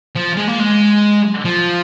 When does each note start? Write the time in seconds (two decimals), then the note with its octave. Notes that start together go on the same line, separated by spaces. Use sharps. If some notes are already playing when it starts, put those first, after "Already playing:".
0.16 F3
0.37 G#3
0.48 A#3
0.60 G#3
1.45 F3